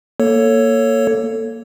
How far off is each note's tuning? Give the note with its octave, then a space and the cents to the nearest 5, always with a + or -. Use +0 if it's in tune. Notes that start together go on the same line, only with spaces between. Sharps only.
A#3 +0 A4 +15 C#5 +0